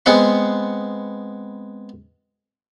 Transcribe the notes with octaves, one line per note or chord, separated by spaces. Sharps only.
G#3 B3 C4 F#5 C6